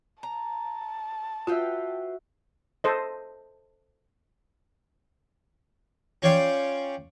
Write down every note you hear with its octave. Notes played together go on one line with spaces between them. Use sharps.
A5 A#5
F4 F#4 B4 E5 F5 G5
A4 C5 D#5
C#4 F4 C#5 D5 G5 C6